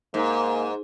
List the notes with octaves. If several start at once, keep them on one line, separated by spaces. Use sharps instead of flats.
G#2 A#3